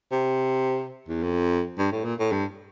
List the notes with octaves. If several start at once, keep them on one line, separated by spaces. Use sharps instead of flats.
C3
E2
F2
G2
A2
A#2
A2
G2